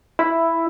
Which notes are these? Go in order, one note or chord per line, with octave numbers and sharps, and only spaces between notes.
E4